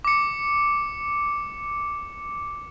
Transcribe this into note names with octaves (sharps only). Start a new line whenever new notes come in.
D6 C#7